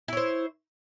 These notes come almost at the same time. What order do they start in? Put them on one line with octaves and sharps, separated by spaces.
E4 C#5 C5